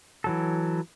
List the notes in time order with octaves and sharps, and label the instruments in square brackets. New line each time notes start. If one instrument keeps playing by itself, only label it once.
[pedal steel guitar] E3 F#3 A4